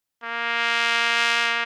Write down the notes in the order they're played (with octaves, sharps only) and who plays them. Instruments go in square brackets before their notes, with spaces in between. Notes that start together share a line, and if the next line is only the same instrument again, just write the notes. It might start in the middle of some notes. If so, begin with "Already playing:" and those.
[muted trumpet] A#3